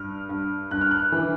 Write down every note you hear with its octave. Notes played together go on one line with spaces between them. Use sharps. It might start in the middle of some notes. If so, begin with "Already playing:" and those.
Already playing: G2 F6
G2
G2 F#6
F6
F#6
E3